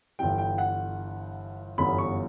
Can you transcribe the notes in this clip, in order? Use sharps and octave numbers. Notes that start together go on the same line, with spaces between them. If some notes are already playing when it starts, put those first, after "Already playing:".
G1 G2 E3 G3 G5
G5
F#5
G1 F#2 E3 G3 B3 B5
C#6